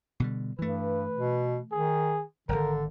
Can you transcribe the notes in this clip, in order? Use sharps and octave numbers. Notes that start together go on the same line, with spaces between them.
B2 D3 G3
G2 E3 A3 B4
B2
D#3 G#4
D#1 G#1 D3 A#4